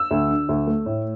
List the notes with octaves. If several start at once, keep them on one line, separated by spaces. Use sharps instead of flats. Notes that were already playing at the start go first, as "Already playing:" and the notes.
Already playing: E6
D2
D3
D2
A3
A2